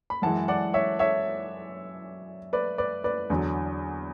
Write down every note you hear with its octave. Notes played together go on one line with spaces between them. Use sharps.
B5
F#2 E3 G#3 F#5 A5
D5 F#5
C#5 E5
C#5 E5
B4 D5
B4 D5
B4 D5
E2 D3 F#3